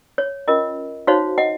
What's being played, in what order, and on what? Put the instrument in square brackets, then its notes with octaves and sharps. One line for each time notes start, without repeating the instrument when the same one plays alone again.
[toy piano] C#5
C#4 F4 A#4 D#5
D#4 F#4 C5 C#5 F5
D#5 F#5